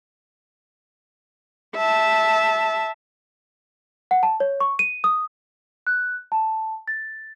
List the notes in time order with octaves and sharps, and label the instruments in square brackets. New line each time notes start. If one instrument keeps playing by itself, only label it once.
[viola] E5 A5
[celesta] F#5
A5
C#5
C#6
D#7
D#6
F#6
A5
A6